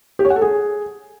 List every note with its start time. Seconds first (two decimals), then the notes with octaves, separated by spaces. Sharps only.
0.19 G4
0.25 C#5
0.30 F#5
0.36 A4
0.42 G#4